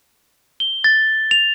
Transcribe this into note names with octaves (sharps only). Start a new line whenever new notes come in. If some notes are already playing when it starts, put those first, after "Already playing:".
G7
A6
F7